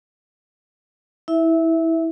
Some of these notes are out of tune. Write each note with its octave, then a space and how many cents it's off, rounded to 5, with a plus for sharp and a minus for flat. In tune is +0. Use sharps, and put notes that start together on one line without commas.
E4 -20 E5 +0